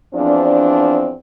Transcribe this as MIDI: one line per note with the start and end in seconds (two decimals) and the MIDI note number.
0.15 1.14 40
0.15 1.14 53
0.15 1.14 60
0.15 1.14 62